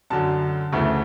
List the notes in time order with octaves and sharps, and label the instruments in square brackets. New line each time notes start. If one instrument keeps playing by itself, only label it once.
[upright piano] F#2 D3 F#3 A5
D2 C#3 E3 A3